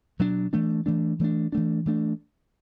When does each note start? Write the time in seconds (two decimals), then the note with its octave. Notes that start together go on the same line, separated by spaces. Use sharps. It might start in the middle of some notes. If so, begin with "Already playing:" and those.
0.19 B2 F#3 D4
0.53 E3 A3 D4
0.86 E3 A3 D4
1.19 E3 A3 D4
1.52 E3 A3 D4
1.86 E3 A3 D4